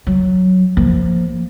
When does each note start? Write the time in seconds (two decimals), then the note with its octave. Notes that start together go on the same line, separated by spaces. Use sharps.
0.07 F#3
0.77 F3 A#3